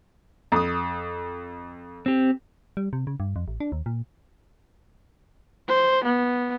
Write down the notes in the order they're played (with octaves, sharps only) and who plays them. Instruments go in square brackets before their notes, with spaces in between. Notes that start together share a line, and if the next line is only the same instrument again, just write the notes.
[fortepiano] F2 D#6
[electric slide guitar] C4 G4
[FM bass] G3
C3
C#3
G2
F2
A1
D4
D#2
A#2
[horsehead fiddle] C5
B3